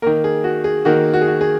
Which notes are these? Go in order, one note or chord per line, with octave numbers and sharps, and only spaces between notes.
D#3 A#3 A#4
G#4
F#4
G#4
D#3 A#3 F#4
F#4
G#4
F#4
G#4